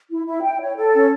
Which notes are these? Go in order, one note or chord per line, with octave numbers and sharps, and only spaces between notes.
E4
E4
G5
C#5
A4
C#4